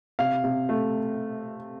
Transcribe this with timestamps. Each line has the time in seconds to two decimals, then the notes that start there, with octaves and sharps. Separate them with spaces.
0.19 C3 F5
0.44 C3
0.69 A3